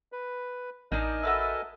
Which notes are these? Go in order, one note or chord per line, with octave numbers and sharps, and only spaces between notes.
B4
A1 D4 D#4 A#4 D#5 G#5
F#4 A4 B4 E5